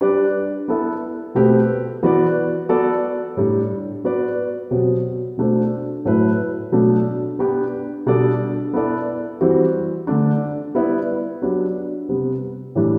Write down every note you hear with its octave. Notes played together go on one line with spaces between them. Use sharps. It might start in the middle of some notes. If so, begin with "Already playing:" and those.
G3 D4 G4 B4 D5
B3 E4 A4
B2 A3 C4 G4 B4
E3 B3 F#4 B4 D5
B3 F#4 A4 D5
A2 G3 D4
B3 F#4 B4 D5
B2 F#3 C4 G4
B2 A3 D4 F#4 C5
A2 F#3 A3 E4 B4
B2 F#3 A3 D4
B3 D4 G4
B2 G3 D4 A4 D5
B3 E4 A4 D5
E3 G3 C4 F#4
D3 A3 D4
G3 B3 E4 B4 D5
F#3 B3 D4 G4
C3 G3 B3
A2 E3 G3 D4